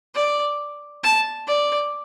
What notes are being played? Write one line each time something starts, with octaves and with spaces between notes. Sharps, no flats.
D5
A5
D5